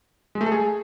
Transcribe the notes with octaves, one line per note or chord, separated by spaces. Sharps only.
G#3
A3
A4
G#4